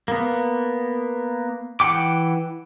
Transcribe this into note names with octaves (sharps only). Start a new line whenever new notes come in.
A#3 B3
E3 F#5 G5 D6